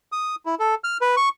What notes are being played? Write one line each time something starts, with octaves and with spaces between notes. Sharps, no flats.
D#6
E4
A4
F6
B4
C#6